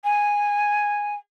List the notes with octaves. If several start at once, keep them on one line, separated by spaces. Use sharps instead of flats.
G#5